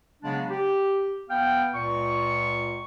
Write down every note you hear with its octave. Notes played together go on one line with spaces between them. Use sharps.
C#3 F#3 G#3 B3 D4
G4
B3 F5 G5
C#2 A#2 C#6